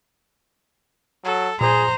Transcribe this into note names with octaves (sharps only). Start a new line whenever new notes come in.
F#3 A4
A#2 G#4 C5 A#5